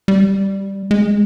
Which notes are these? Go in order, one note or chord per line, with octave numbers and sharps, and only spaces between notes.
G3
G#3